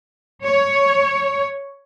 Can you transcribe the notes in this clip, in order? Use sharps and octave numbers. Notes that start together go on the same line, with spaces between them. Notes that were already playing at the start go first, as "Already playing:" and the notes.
C#5